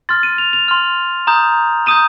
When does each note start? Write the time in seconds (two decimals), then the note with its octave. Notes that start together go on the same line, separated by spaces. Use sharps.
0.09 C6 F6 A6
0.23 D#7
0.38 F7
0.53 F7
0.68 C6 F6
1.27 A#5 D#6 G6
1.86 A#5 D#6 G6 D#7